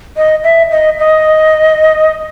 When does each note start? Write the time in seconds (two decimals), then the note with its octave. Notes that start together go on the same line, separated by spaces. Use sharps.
0.17 D#5
0.44 E5
0.71 D#5
0.99 D#5